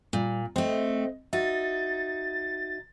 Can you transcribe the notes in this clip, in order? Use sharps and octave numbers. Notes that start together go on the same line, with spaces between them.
A#2 G3
A3 C4 C5 D#5
D#4 F#4 E5 A6